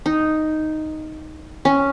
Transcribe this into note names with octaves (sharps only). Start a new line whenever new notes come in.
D#4
C#4